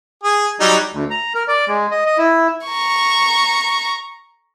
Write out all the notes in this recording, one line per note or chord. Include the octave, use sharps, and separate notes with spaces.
G#4
F#3 G3 D#4
D2
A#5
A#4
D5
G#3
D#5
D#5
E4
A#5 C#6